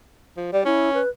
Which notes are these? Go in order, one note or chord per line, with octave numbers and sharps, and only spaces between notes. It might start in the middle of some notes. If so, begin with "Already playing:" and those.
F3
G3 D5
C#4 E4
B4